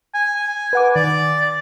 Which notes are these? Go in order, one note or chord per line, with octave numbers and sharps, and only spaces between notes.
G#5
G#5
B4 F#5 D6
D#3 D5
A6